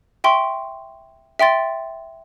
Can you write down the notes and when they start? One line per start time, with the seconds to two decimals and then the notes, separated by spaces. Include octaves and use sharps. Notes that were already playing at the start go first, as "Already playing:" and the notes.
0.24 E5 G5 C6 C#6
1.39 E5 G5 C6 A6